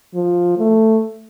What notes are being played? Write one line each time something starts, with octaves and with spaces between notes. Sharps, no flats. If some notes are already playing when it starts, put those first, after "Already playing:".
F3
A3